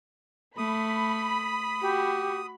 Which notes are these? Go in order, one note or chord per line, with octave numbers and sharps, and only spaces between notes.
A3 B5 D#6
F#4 G4